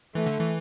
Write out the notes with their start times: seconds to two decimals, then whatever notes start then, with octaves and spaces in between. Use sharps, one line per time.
0.15 E3 A3
0.26 D3
0.39 E3